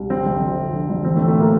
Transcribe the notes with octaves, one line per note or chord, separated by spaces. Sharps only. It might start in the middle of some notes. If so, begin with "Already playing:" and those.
Already playing: C2
G1 C4
G1
G1
F2
D3
G1
A1 C4
A3
A2
A3
A#3